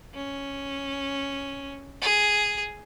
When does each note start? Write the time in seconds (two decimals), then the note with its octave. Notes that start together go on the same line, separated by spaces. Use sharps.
0.14 C#4
2.02 G#4